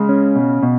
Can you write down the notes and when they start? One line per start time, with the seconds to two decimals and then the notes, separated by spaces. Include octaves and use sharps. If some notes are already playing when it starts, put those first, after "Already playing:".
Already playing: C#3 G#3
0.09 C#4
0.36 B2
0.63 B2